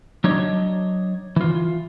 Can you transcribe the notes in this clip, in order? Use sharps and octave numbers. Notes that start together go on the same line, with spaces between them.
F#3 D4 C#5 D#5
E3 F4